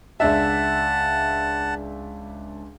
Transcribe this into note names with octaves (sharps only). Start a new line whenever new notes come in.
C#2 D4 E5 F#5 A5